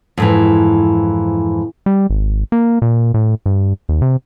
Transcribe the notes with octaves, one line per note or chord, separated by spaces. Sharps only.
F2 G#2 E3
G3
G#1
A#3
A#2
A2
G2
D#2
C3